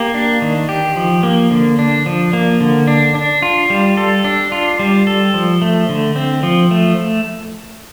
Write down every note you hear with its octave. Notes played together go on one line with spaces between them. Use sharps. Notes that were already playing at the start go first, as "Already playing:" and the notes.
Already playing: A#3 G4
D4
D#3
G4
F3
A#3
D3
D4
F3
A#3
D3
D4
D4
F4
G3
A4
D4
F4
G3
A4
F3
A3
D3
C4
F3
A3